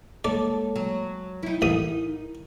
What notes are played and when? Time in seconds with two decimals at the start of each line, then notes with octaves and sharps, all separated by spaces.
0.24 G#3 A#3 A4 C#5 D5
0.76 F#3
1.43 F#3 D#4 E4
1.62 A1 A#4 D#6